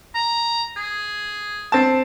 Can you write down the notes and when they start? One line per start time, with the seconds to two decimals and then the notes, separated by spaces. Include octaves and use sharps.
0.15 A#5
0.77 G#4
1.72 C4 A5